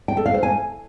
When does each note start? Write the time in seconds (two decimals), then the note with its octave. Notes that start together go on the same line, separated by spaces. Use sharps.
0.08 G5
0.17 A4
0.26 F5
0.34 C5
0.43 G#5